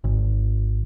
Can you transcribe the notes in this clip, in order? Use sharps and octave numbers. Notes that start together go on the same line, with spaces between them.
G#1